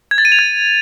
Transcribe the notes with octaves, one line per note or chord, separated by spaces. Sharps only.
G#6
A6
D#7
F7
G#6